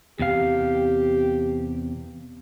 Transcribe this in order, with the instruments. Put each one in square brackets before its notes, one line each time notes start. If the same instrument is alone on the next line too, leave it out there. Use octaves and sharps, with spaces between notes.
[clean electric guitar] E2 C3 F5 [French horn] G4